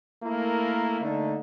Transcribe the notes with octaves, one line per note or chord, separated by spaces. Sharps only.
A3 A#3 E4 A#4
D3 A3 A#3 D#4